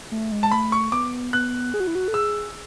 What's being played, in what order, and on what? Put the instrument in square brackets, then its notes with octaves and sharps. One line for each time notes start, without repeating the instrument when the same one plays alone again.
[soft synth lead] A3
G#3
[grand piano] A5
[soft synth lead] A3 [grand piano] B5
[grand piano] C#6
[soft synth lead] B3 [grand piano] D6
[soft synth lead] B3 [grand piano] F#6
[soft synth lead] G#4
F#4
E4
F#4
A4
[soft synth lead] G#4 [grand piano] E6